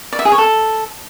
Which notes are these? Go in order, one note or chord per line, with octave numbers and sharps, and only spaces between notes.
D5
E5
G#4
C#5
A4